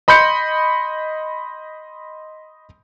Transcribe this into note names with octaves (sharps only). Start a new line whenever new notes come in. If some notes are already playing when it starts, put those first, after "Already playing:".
D#5 B5 C6 G6 C#7